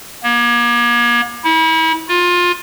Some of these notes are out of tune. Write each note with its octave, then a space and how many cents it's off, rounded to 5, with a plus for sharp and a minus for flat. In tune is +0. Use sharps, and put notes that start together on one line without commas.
A#3 +40
E4 -35
F4 +20